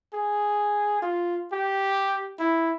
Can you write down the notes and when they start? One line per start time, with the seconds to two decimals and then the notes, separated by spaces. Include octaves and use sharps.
0.14 G#4
1.02 F4
1.53 G4
2.39 E4